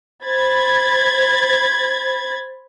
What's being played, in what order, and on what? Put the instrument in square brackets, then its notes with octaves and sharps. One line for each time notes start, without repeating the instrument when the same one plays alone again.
[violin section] C5 B5 G#6 A6